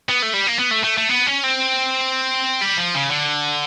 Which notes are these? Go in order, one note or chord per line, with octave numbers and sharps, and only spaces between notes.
B3
A3
G3
A#3
B3
A3
A3
A3
B3
C#4
C4
G3
F3
C#3
D3